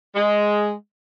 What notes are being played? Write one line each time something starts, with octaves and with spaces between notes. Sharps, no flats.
G#3